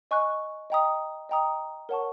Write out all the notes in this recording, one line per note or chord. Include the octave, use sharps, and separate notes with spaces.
D#5 G#5 C#6 F#6
D#5 G5 A#5 D#6
D#5 G5 A#5 D#6
A#4 C#5 F#5 A5 C#6